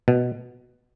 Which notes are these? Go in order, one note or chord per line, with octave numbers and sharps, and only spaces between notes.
B2